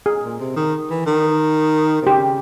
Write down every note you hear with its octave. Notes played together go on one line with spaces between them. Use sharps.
G#4
A#2
C3
D#3
E3
D#3
C3
C#3 G4